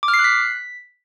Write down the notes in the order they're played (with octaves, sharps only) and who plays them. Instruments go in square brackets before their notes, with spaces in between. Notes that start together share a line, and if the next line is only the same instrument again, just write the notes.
[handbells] D6
F6
C7
F#6
B6